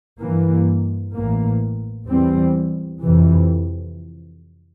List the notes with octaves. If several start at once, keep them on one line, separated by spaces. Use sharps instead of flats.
G2 E3 A#3
A1 A2 E3 A#3
E2 E3 G3 C4
F2 C3 E3